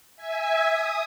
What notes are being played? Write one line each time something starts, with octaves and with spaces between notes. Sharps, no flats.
E5 G#5
D#6